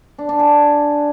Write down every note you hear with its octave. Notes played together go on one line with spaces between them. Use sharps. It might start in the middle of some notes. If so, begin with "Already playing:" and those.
D4
D4
G#4